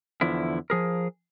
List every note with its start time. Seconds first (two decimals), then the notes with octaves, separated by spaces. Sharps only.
0.21 E2 D3 F3 E4
0.70 F3 G#4 A#4